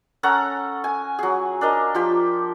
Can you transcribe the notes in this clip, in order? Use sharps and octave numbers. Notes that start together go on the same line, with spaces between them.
C#4 A4 F#5 A#5
G#5
F#3 G#4
D4 A#4 D#5
F3 G4